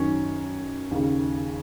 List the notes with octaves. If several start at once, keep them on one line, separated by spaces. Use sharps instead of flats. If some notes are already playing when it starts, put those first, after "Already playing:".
Already playing: F#2 D#3 C#4
D#2 C#3